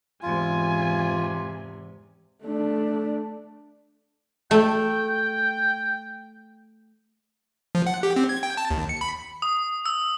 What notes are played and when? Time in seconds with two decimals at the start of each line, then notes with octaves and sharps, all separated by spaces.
0.23 E2 G#2 C3 F4 G#5
2.44 A3 D4
4.51 A3 G5
7.75 F3
7.87 F#5
8.03 G4
8.16 C4
8.29 G#6
8.43 G5
8.57 A5
8.71 D#2
8.89 C#7
9.01 B5
9.42 D#6
9.86 E6